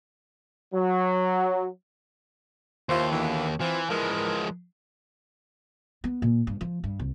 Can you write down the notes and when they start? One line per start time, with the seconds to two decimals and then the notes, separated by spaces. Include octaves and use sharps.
0.74 F#3
2.89 D#2 E4 F4 C5
3.11 B2 D3 E3
3.61 E3 C4 F4
3.90 E3 F3 G#3 A#4
6.04 B3
6.22 A#2
6.47 G2
6.61 F3
6.84 G2
6.99 C2